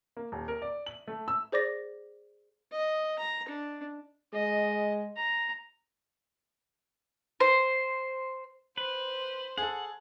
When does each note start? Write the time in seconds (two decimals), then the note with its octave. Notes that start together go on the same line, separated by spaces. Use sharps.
0.17 A#3
0.32 D#1
0.48 A#4
0.62 D5
0.86 F#7
1.07 A3
1.28 E6
1.52 G#4 C5 D5 D6 A#6
2.72 D#5
3.19 A#5
3.48 D4
4.33 G#3 D#5
5.16 A#5
7.40 C5
8.78 B4 C5
9.58 G#4 A4 F#5